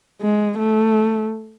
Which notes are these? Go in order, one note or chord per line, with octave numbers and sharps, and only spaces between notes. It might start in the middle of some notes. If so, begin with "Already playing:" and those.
G#3
A3